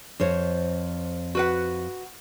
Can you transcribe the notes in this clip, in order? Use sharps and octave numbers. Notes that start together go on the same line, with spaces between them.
F2 C5 C#5
F#4 B4 F#5